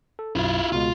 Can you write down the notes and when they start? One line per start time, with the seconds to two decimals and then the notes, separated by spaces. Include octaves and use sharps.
0.19 A4
0.36 B1 F#2 E4 F4
0.72 C#2 B2 G#3 F4